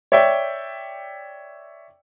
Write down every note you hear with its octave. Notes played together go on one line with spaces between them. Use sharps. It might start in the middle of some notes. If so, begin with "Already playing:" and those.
C#5 D5 E5 G5